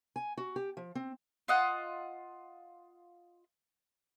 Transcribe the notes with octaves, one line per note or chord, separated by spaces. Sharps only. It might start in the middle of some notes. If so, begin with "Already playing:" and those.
G#5
F#4
G4
F3
C4
F4 D#5 F#5